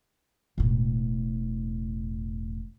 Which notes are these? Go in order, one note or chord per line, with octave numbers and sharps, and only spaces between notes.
E1 A2